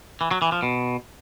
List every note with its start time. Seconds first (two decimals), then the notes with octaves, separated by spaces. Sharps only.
0.21 E3
0.31 F#3
0.42 E3
0.52 F3
0.63 B2